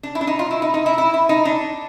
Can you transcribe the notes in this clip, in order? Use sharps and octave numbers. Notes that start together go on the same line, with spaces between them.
D4
E4
D4
D#4
F4
E4
D#4
D#4
E4
E4
E4
D#4
D4